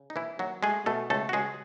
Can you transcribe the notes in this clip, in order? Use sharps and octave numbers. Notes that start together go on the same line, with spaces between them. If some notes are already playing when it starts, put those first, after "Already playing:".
Already playing: C#3
D#4
D#2 E3 E4
D#2 F#3 F#4
G#3 A3 G#4
B2 A3 A4
C#2 A3 A4
F#4
C#2 G#3 G#4